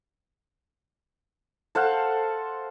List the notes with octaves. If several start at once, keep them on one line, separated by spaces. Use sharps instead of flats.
A4 C5 F5 F#5